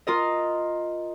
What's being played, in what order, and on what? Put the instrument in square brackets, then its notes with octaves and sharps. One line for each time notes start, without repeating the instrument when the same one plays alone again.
[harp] F4 A#4 D#5